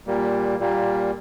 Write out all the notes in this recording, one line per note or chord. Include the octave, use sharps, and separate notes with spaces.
A#2 G3 A#3
A#2 G3 A#3